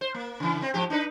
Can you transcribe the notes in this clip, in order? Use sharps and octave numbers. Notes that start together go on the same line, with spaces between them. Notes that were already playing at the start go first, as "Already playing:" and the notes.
C5
A#3
C#3 E3
C4
G#2 F3 G4
D4 D#4 B4